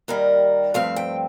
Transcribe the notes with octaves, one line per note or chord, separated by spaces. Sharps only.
D#2 D#3 G3 A#4
G2 F3 A3 C4 F5
G5